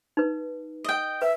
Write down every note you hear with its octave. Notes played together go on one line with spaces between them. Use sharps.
D#4 B4
D#5 G5
B4 E5